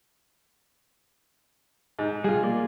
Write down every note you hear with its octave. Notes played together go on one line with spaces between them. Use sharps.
G#2
B1 G3 F4 G#4
A#3 D5